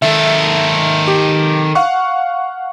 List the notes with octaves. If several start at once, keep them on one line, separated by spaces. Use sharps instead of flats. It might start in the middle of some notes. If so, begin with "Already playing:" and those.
D#3 A4 E5
G4
F5 F#5 C#6